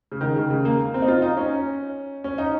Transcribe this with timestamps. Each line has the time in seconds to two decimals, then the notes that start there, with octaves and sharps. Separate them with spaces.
0.12 C#3
0.21 D#3
0.36 C#3
0.50 C#3
0.65 A#3
0.94 C4
1.02 D#4
1.08 F4
1.22 D#4
1.37 C#4
2.24 C#4
2.38 D#4